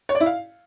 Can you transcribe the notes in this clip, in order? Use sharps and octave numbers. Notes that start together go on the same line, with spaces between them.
C#5
D5
E4
F5